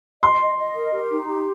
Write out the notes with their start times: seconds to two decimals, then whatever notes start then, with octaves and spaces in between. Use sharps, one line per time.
0.22 D#5 C6
0.40 D#5
0.57 D#5
0.75 A#4
0.92 G4
1.10 D#4
1.27 G4